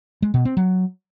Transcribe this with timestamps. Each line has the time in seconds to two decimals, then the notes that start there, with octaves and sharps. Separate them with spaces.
0.22 G#3
0.34 B2
0.45 C4
0.57 F#3